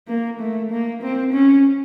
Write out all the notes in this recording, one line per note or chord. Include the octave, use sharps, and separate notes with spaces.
A#3
A3
A#3
C4
C#4